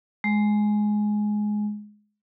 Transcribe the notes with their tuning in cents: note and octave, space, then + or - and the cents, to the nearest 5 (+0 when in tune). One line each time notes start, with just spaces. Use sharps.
G#3 +10